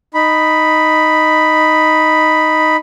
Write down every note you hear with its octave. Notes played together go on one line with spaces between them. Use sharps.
D#4 B5